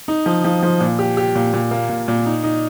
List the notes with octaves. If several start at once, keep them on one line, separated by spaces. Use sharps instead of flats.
D#4
F3
F3
F3
A#2
G4
G4
A#2
A#2
A#3
A#2
A#2
D#4
D#4